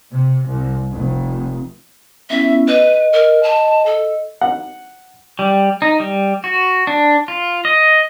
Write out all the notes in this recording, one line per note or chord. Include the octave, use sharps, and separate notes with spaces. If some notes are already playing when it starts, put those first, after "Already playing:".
C3
C2
F1
B3 C#4 E4 E5
B4 D#5
A#4
A5
A4
F#5
G3
D#4
G3
F#4
D4
F4
D#5